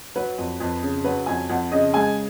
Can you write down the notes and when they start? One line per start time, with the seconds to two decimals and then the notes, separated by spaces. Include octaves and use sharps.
0.15 F#3 B4
0.38 F2
0.60 F2
0.82 C#3
1.04 F#3 B4
1.26 F2 G#5
1.49 F2 F#5
1.72 C#3 D#5
1.94 G#3 G#5